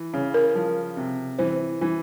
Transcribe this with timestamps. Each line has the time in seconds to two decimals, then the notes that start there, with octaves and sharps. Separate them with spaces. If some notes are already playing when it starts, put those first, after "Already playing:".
Already playing: E3
0.14 C#3
0.34 A#4
0.55 F3
0.97 C3
1.39 E3 C5
1.81 E3